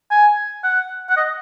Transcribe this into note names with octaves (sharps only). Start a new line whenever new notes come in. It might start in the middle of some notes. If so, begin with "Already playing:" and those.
G#5
F#5
F#5
D#5